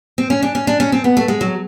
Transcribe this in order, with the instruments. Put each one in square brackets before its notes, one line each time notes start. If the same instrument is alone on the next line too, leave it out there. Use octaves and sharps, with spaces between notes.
[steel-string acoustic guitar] C4
C#4
D4
C#4
D4
C#4
C4
B3
A3
G#3
F#3